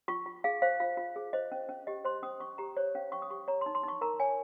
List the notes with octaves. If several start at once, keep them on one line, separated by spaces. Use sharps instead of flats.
F4 C#6
F4
G#4 F5
C5 F5
F4 F5
F4
G#4
C5 D#5
C#4
C#4
G4 D#5
C5 C6
C#4 D#6
C#4 C#6
G4 A#5
C5 C#5
C#4 F5
C#4 C#6
D#6
G4 C#6
C#5 A#5
C6
D#4
C6
D#4 C#6
A#4 A#5
C#5 G#5